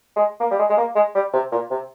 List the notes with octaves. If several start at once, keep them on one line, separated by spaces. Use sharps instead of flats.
G#3
A#3
G3
G#3
G#3
A#3
G#3
G3
C3
A#2
C3